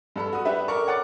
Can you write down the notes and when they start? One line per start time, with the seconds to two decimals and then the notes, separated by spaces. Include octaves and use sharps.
0.16 G2 A4 B5
0.33 F#4 D#6
0.45 D4 G4 B4 E5
0.68 A4 A#4 D5 C#6
0.87 C#5 F#5 D6 A6